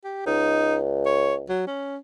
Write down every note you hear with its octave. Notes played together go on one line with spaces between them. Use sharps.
G4
C#2 D#4
C#5
F#3
C#4